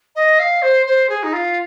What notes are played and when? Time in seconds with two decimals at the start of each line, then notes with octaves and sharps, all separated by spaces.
0.15 D#5
0.39 F5
0.62 C5
0.86 C5
1.09 G#4
1.23 D#4
1.33 F4